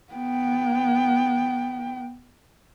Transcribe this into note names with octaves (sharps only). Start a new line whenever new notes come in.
B3 G5